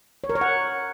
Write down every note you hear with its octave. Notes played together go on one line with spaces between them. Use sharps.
C#5
A#4
C#5
F#5